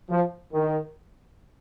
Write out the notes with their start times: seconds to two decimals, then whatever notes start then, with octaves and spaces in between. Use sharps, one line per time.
0.09 F3
0.52 D#3